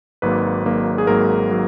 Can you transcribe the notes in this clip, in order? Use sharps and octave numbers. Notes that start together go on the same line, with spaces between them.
G#1 G#2 F#3 A#3 B4
G#1 G#2 F#3 A#3
G#4
G#1 G#2 F#3 A#3 A#4
F#3 A#3